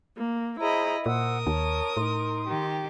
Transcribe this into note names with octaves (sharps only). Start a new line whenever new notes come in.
A#3
E4 G#4 C5 D#5 A#5 B5
A#2 A#4 C5 F#5 D#6 E6
D#2 C#5 A5
A2 D#4 C6
D#3 G4